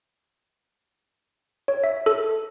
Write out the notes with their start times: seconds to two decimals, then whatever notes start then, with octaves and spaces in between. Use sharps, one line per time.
1.68 C#5
1.84 E5
2.06 A4